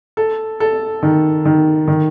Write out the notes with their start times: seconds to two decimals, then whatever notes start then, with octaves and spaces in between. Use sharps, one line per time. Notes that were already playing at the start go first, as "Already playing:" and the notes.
0.17 A4
0.60 A4
1.03 D#3
1.45 D#3
1.88 D#3